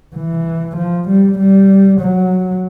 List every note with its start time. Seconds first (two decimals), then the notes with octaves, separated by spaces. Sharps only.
0.16 E3
0.77 F3
1.08 G3
1.39 G3
2.01 F#3